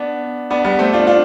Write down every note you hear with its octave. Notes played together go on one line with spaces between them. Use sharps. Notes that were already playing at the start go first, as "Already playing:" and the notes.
Already playing: B3 D4
B3 D4
G3 B3
A3 C4
D4 F4
D4 F4